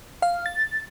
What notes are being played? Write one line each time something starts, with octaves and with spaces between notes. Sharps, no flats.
F5
A6